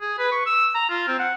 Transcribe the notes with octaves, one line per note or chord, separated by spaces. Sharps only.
G#4
B4
C#6
E6
A#5
F4
C4
F#5